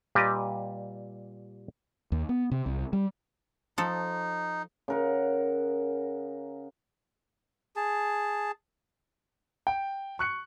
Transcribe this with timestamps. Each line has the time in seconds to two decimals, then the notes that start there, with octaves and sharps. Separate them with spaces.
0.15 A#2 G3 G4 B4 D#5
2.12 D#2
2.29 B3
2.51 C3
2.66 C2
2.93 G3
3.78 F3 D#4 A4
4.88 C#3 A#4 F#5
7.76 G#4 A5
9.67 G5
10.19 C#6 F#6 C#7